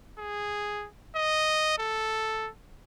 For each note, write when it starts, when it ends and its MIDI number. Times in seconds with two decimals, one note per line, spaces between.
0.19 0.87 68
1.16 1.75 75
1.79 2.49 69